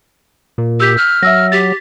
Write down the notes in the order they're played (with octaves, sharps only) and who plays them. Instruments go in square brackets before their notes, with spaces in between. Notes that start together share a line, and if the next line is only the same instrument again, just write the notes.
[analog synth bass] A#2
[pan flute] G4 [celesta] E6 G6 B6
[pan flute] F6
[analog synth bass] F#3 [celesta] E5 E6 A#6
[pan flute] G4 [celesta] A6 B6